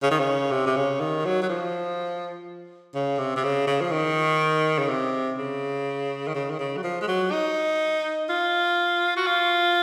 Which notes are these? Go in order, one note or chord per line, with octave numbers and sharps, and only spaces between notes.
C#3
D#3
C#3
C3
C3
C#3
D#3
F#3
F#3
F3
C#3
C3
C3
C#3
C#3
F3
D#3
C#3
C3
C#3
D#3
C#3
D#3
C#3
F#3
F3
G#3
F#3
D#4
F4
F#4
F4